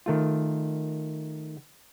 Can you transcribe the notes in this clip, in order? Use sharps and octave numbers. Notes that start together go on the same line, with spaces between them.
D#3 A3 F4